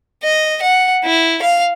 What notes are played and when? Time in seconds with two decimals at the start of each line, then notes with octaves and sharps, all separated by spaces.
0.23 D#5
0.62 F#5
1.04 E4
1.42 F5